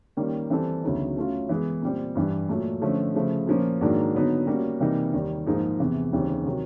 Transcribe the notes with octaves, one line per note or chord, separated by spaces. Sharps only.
D#3 G3 A#3 C#4
E3 G3 C4 E4 A4
D2 C#3 F#3 B3 D#4
F#3 A3 C#4 F4
E3 G#3 B3
A#2 G3 C4
G2 E3 G3
A#2 F#3 A3
D3 F3 A3 C#4
C#3 F3 A3
A#2 F3 A#3 C#4
G#2 D#3 F#3 A#3 D4
D3 F#3 B3 D#4
G3 A#3 C#4 F#4
C3 E3 G3 A#3 D#4
D#2 D#3 G3
G#2 F3 A#3 D#4 G#4
E2 C3 E3
D#2 C#3 E3 G3 C4
C3 D#3 F#3